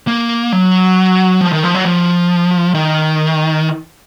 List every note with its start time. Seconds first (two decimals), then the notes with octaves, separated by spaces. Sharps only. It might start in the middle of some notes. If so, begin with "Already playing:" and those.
0.08 A#3
0.52 F#3
1.41 F3
1.53 D#3
1.63 F3
1.75 F#3
1.86 F3
2.75 D#3